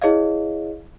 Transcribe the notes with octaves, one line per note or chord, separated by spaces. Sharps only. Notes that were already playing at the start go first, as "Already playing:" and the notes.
E4 G#4 C#5 D#5 F5